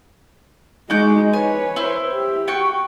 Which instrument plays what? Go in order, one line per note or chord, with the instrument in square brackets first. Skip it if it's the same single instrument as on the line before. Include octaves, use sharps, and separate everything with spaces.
[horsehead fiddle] G#3 D#4 [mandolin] F#4 D6 G6
[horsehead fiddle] B4 C#5 [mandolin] G#5
[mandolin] E4 C5
[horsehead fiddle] G4
[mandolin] F#4 G5 C#6